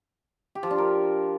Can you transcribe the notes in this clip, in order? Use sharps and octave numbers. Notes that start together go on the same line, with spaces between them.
G4
F3
D4
A#4